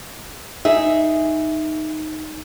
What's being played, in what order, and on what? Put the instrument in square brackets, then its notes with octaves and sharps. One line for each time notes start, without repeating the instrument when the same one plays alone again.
[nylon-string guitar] D#4 G#4 E5